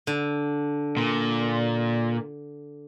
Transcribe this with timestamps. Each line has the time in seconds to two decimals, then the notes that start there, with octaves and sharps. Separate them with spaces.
0.07 D3
0.97 A#2